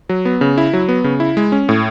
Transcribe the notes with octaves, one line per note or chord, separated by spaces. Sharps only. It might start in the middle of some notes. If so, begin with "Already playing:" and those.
F#3
B3
C#3
E4
F#3
B3
C#3
E4
G#3
C#4
A2